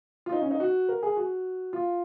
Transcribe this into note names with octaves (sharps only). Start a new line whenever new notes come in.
F4
D#4
C#4
D#4
F#4
A#4
G#4
F#4
F4